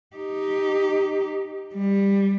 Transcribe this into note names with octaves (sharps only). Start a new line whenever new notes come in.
D#4 G4
G3